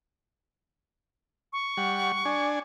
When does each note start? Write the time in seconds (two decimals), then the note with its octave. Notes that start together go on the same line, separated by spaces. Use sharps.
1.53 C#6
1.77 G3 F#5
2.25 D4 G#5